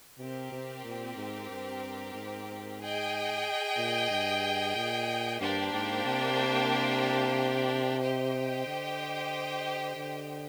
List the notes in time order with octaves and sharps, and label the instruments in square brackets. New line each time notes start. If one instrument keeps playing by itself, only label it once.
[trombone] C3 [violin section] C4 G4 A#4
[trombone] C3
A#2
G#2
G2
G#2
[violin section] G#4 D#5 G5
[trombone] A#2
G2
A#2
[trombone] G2 [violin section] A#3 D4 G4 C5 G5
[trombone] G#2
C3
[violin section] G4 C5 D#5 G5
[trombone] D3
D3